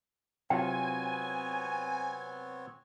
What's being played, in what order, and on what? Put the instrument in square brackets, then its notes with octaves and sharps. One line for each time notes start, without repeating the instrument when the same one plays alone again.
[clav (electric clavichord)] C3 F#3 F4 [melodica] B3 C4 C#5 [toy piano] G5 [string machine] G#5